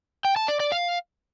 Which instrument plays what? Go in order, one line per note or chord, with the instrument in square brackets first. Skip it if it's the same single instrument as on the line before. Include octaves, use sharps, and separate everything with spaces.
[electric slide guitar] G5
A5
D5
D5
F5